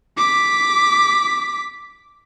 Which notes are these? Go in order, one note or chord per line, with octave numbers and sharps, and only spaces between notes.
D6 B6